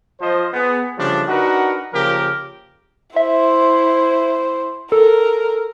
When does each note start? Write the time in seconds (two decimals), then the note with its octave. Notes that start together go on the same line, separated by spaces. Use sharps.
0.20 F3 C5 D#5
0.54 B3 G#4
0.98 C#3 F3 G3 A3 D4
1.28 D4 D#4 F#4 A#4 B4 F#5
1.93 C#3 F3 A#3 G4 A#4
3.16 E4 C5 E5
4.92 A4 A#4